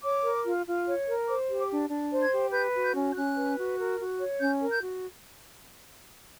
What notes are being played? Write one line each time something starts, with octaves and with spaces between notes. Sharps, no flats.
C#5 D6
A#4
F4
F4
C#5
A#4
C5 D6
G4
D6
D4
D4
C5
G#6
G4
B4 G6
F#4
G6
C#4
G6
C#4 F#6
B4
F#4
A#4
F#4
C#5
C#4 G6
A#4
G6
F#4